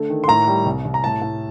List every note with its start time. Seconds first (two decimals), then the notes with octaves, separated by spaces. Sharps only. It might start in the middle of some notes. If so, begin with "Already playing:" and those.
Already playing: D3 A3
0.10 D#3
0.24 C6
0.28 A2 A#5
0.47 G3
0.66 C2
0.85 C2
0.94 A#5
1.04 A2 A5
1.22 A2